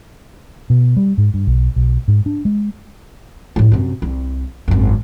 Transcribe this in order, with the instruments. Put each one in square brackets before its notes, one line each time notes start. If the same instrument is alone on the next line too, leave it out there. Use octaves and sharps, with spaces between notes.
[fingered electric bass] B2
G3
G#2
G2
B1
B1
G#2
D4
G#3
[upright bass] A2 G3
F#2 C3
C2
G#1 F#2